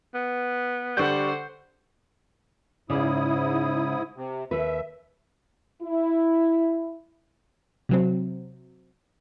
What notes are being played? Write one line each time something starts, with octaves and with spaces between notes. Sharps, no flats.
B3
D3 G3 C5 F#5 C#6 G6
G#2 C#3 E4 D5 D#6
C3
D#2 B4 E5
E4
C3 F#3 C4